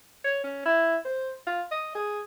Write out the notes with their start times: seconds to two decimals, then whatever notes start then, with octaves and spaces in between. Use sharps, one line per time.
0.24 C#5
0.44 C#4
0.66 E4
1.05 C5
1.47 F4
1.71 D#5
1.95 G#4